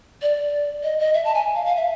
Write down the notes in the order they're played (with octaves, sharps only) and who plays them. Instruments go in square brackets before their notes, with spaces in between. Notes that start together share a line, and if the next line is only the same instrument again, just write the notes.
[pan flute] D5
D#5
D#5
E5
A5
G#5
F5
F5
E5